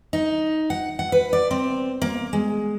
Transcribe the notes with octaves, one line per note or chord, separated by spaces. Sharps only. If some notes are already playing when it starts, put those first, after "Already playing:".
D#4
F#5
F#5
B4
D5
C4
A#3
G#3